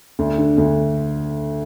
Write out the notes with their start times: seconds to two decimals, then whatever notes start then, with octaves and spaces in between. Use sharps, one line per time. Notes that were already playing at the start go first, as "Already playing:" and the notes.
0.19 D2
0.38 D3
0.58 D2